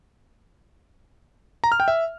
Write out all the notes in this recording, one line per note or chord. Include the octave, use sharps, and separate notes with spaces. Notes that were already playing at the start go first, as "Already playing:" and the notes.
A#5
F6
G5
E5